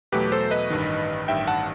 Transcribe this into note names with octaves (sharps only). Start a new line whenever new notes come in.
E2 B2 F#3 A3 G4 B4
A4 C5
B4 D#5
A1 G2 D#3
A1 G2 D#3 E5 G5
F#5 A5